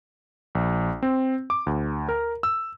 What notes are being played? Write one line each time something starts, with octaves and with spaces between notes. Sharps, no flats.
A#1
C4
D6
D2
A#4
E6